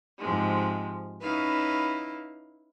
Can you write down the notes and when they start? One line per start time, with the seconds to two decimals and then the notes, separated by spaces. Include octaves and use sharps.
0.19 G#2 C3 F3 G#3
1.22 C#4 D#4 E4 B4 F5